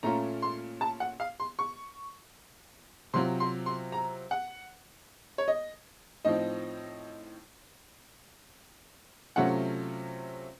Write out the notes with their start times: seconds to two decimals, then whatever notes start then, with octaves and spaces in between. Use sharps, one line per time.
0.03 A#2 A3 C#4 F4 A#5
0.42 C6
0.81 A5
1.00 F#5
1.20 F5
1.40 C6
1.59 C#6
3.14 C3 F#3 C4 F4 C6
3.40 C6
3.66 C6
3.92 A#5
4.31 F#5
5.38 C#5
5.48 D#5
6.25 A2 F3 C4 D#4 D#5
9.36 C3 F#3 A3 C#4 F4 F#5